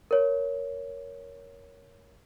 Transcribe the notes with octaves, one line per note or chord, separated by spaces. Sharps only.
A#4 C#5